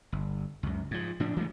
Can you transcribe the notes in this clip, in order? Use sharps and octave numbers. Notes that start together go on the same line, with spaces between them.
G1
C#2 F#2
G#2 F3
A2 F3 D4
E3 F3 G#3 A3